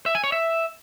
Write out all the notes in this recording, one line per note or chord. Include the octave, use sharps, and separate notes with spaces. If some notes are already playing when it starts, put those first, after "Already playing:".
E5
G#5
C#5
E5